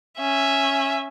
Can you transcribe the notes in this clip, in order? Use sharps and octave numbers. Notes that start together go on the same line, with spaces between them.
C#4 E5